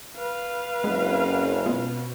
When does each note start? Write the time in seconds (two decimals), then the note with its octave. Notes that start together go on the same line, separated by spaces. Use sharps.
0.16 B4 F5
0.84 F#1 G#3 C4 C#4
1.66 B2 G#3 B3 F4